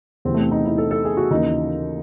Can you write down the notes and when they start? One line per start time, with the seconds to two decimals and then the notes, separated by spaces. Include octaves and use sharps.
0.25 E2 C3 E3 C4
0.34 A3
0.39 C4
0.51 D#4
0.65 E4
0.78 A4
0.91 A4
1.05 G#4
1.17 F#4
1.31 D#2 C#3 E3 D#4